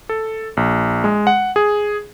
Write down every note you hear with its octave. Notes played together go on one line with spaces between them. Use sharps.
A4
A#1
G#3
F#5
G#4